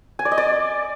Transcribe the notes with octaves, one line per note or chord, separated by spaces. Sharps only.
G#5
D5
D#5
D5